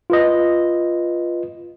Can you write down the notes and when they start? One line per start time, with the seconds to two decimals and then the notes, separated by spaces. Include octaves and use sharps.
0.10 F4 B4 D#5